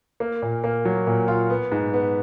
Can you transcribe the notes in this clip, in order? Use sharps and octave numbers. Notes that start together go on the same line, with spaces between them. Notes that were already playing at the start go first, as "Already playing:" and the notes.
A#3
A#2
A#3
F#3
A#2
F4
B3
G#2
B3